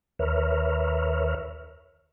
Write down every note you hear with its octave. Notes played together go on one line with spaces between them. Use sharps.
D#2 A#4 B4 C#5 E5 F6